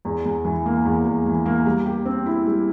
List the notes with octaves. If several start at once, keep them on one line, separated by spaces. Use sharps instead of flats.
E2
E2
E3
A#3
E2
E2
E3
A#3
G3
G4
C4
E4
G3